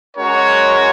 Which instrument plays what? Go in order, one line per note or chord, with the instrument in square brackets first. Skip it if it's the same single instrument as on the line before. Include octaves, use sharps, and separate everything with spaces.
[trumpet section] G#3 C#4 F#4 A#4 C#5